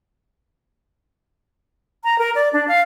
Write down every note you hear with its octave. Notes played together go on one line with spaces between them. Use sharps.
A#5
A#4
D5
D4
F5